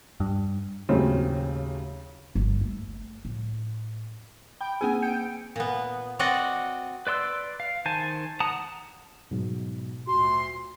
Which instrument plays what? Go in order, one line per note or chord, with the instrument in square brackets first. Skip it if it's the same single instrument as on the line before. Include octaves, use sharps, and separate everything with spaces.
[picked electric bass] G2
[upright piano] D#2 A2 C#3 F#3 C4
[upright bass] G1
A3
A2
[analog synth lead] G5 [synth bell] B5
[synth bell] A#3 C4 G#4 [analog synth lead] G#5
[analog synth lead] G5 [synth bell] C#7
[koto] A#2 B3
C4 F#4 D5 D#5 F#5
[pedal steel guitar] B4 D5 C6 E6
F5
D#3 C5 G#5 A5
F#5 A5 A#5 D#6
[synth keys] G#2 B2 F#3
[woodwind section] D2 A#2 C6 [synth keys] F#4